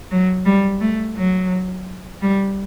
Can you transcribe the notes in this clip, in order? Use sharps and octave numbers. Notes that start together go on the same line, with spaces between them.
F#3
G3
A3
F#3
G3